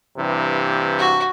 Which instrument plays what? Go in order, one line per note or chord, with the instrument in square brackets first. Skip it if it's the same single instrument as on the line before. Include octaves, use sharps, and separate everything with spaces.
[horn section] G2 C3 E3
[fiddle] F#4